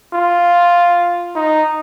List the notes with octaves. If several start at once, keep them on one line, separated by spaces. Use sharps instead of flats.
F4
D#4